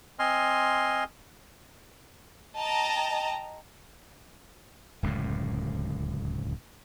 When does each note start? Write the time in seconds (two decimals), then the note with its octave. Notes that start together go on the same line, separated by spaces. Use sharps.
0.19 C4 D#5 G#5 C6 F6
2.57 D#5 G5 A5 A#5
5.03 D1 C#2 F#2 A2